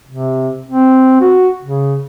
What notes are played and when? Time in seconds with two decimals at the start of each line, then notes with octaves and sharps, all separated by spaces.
0.09 C3
0.69 C4
1.21 F#4
1.62 C#3